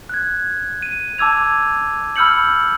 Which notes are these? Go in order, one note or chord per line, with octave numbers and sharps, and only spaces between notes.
F#6 G#6
D#7
A5 D6 E6 G#6 F7
B5 E6 F6 G6 C#7 F#7